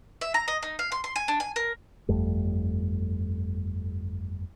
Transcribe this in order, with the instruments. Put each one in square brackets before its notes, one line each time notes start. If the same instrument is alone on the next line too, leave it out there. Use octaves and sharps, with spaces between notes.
[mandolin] E5
A#5
D#5
D#4
F5
C6
C6
G#5
D4
G#5
A#4
[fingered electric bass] G1 F2 G3 A3